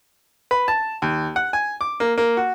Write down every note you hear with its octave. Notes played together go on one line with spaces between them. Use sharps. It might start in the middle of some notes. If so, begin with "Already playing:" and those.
B4
A5
D#2
F#5
G#5
D6
A#3
A#3
F#4